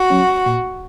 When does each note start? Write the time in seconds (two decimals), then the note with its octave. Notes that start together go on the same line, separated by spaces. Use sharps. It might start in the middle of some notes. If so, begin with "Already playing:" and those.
Already playing: F#4
0.10 F#3 C#4
0.46 A#2